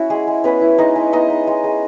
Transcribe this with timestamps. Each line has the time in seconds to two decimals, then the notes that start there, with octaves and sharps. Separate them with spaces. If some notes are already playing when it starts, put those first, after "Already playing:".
Already playing: C#4 E4 F#4
0.10 G#3 G#4
0.27 G#3
0.44 B3 C#4 B4
0.61 E4
0.78 G#3 D#4 D#5
0.96 G#3
1.12 B3 D#4 D#5
1.30 D#4
1.47 G#3
1.64 G#3